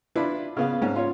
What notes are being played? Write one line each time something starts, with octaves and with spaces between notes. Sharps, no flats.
D4 E4 F4 B4
C#3 B3 F5
G#2 C#4
F4 C#5